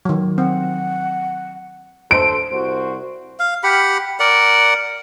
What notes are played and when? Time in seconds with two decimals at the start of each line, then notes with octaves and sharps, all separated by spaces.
0.05 D#3 F#3
0.38 C4 F#5
2.11 D2 A4 C5 D7
2.51 C2 F#4 C5
3.40 F5
3.64 G4 F#5 B5
4.20 A#4 D5 F#5